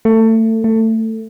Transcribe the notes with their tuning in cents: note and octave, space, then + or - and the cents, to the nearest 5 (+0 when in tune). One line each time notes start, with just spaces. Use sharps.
A3 +25
A3 +20